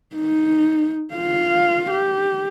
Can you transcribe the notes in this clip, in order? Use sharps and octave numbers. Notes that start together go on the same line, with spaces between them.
D#4
F4 F5
G4